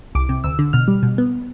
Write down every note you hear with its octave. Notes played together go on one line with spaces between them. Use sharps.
C2 D6
C3
D2 E6
D3
B2 F6
G3
B2
B3